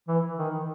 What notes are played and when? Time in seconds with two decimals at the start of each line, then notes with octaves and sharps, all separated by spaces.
0.08 E3
0.39 D#3